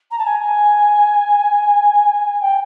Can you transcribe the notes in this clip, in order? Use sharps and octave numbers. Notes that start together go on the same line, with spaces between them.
A#5
A5
G#5
G5